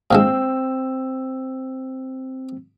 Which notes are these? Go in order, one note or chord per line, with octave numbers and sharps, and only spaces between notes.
A#2 D3 G#3 C4 E6